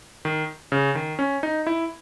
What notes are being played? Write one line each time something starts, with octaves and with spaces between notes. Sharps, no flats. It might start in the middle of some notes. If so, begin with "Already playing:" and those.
D#3
C#3
D#3
C#4
D#4
E4